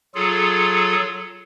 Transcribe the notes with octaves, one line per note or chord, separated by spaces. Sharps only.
F#3 F4 G#4 A4